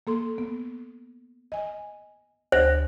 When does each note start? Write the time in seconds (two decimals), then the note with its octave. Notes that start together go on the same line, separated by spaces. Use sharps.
0.07 A#3 A4 C6
0.38 B3
1.52 D#5 G#5
2.52 D2 C5 A#6